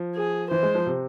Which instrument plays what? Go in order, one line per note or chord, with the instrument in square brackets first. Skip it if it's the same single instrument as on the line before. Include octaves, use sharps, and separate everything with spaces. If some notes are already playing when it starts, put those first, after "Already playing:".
Already playing: [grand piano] F3
[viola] G#4
[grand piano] E3 [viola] C5
[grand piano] G#3
F3
C3